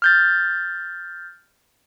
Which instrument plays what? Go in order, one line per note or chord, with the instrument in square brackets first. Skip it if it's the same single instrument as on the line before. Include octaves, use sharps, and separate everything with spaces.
[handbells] F6 G6 A6